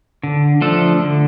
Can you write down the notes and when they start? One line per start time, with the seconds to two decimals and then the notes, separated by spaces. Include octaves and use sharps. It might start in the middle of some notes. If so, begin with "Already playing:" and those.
0.23 D3
0.61 F3 A3 D4 A4
1.00 D3